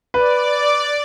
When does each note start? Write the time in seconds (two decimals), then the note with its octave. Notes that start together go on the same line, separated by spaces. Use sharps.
0.14 B4 D5